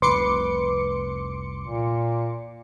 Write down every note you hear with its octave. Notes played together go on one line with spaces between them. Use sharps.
F1 C2 B4 C6 D6 C#7
A#2